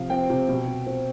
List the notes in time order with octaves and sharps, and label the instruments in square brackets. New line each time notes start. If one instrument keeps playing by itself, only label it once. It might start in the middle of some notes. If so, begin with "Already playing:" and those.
Already playing: [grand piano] C3 F3 F5
C4 G5
C3
B2
B2
C4